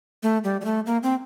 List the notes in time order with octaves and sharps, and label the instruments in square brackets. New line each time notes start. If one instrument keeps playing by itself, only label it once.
[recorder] A3
G3
G3
A3
A#3
C4